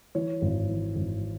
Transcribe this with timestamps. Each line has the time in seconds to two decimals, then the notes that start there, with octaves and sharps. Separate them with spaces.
0.15 E3 C#5
0.42 G#1
0.69 E3
0.96 G#1